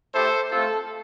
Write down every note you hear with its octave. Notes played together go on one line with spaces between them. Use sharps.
A3 E4 G4 A4 C5
A3 C4 F4 A4